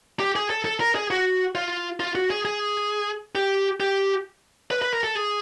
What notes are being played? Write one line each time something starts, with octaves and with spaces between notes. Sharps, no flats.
G4
G#4
A4
A4
A#4
G#4
F#4
F4
F4
F#4
G#4
G#4
G4
G4
B4
B4
A#4
A4
G#4